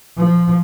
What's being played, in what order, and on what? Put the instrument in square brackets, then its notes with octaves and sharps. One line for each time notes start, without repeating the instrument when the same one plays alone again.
[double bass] F3